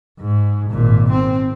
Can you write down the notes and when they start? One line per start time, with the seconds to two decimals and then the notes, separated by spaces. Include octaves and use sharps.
0.20 G#2
0.70 G#1 A#2
1.11 C4